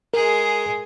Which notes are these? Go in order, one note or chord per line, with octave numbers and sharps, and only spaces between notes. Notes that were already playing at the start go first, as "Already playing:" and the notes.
G#3 G#4 A#4